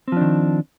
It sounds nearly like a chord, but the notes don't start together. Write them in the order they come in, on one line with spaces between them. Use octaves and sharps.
C4 F3 D4 D#3